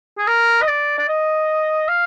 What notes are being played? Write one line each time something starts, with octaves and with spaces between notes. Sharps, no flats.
G#4
A#4
D#5
D5
D5
D#5
F5